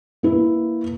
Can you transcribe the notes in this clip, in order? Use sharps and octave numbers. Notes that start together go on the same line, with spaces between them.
A#3 E4 B4